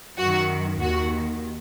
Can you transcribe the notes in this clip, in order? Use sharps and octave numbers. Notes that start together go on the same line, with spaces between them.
F#2 D#3 F#4
D#2 D#3 F#4